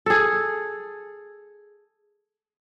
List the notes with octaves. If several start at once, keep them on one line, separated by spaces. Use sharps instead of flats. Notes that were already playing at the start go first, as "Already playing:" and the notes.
G#4 A4